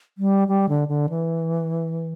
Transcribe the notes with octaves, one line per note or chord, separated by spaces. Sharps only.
G3
G3
D3
D3
E3